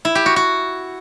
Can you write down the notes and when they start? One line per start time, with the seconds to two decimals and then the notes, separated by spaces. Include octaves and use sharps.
0.05 E4
0.15 G4
0.26 F#4
0.36 F#4